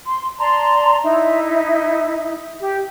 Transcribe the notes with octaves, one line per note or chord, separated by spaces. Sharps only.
C6
D5 A5 A#5 C6
D#4 E4 E5
G4